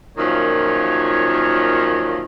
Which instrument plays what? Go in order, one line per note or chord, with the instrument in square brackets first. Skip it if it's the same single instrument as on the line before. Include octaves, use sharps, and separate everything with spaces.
[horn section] F#2 A#2 D#3 F3 C#5